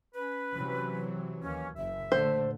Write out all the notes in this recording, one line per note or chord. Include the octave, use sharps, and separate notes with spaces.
C#4 B4
C3 E3 F#3
D#2 E3 A#3 C#4
F#1 E5
A#2 D3 A3 C5